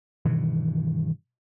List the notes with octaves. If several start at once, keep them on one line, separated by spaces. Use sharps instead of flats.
G2 B2 D#3 E3